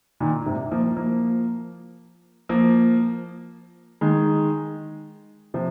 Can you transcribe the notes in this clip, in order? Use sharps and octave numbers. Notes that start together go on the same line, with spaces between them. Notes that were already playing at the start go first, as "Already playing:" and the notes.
A#2 D#3
G#2 C3
F3 A#3
F3 A#3
F3 A#3
D#3 G#3
C3 F3